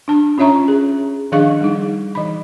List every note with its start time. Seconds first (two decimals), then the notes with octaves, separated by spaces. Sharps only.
0.08 D4 A5
0.38 C#4 F4 C#5 E5 A#5 C#6
0.68 G#4
1.32 D#3 F3 D4 G#4 F5 C#6
1.61 G3 D#4
2.15 E3 B5